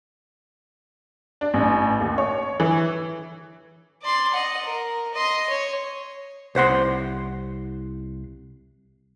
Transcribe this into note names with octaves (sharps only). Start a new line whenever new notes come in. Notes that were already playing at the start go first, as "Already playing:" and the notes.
D4
A1
D#2
C#5
E3
D5 C6
D#5 F#5
A#4
D#5 C6
C#5
C2 C5 F#5 C6